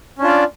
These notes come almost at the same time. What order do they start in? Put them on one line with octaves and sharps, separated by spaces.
C#4 D4 F4 D5